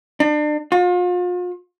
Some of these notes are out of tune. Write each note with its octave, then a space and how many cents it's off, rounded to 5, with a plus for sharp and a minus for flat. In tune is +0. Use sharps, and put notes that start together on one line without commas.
D4 +35
F4 +40